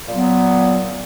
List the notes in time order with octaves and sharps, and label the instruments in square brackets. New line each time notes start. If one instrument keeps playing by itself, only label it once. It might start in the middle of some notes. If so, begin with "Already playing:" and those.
[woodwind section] A#2 F#3 B3